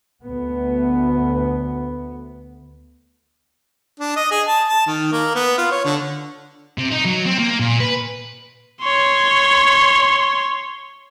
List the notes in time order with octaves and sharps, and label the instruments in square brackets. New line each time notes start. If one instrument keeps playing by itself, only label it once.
[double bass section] D2 B3
[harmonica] D4
D#5
G#4
A5
A5
D#3
A#3
B3
F4
C#5
D3
[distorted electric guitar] C3
D#4
F#3
C4
A#3
A#2
B4
[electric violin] C#5 C6